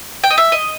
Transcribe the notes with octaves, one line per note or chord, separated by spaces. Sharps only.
G5
D#5
E5
D#5